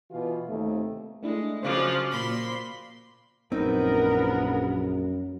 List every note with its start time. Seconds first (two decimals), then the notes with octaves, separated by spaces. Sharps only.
0.10 B2 E3 F4
0.48 D#2 C3 A3
1.23 G#3 A3 D4 E4
1.63 C#3 F3 F#3 C5 F5 D6
2.10 A#2 B5 C6
3.52 A#1 F#2 B3 C4 D#4 A#4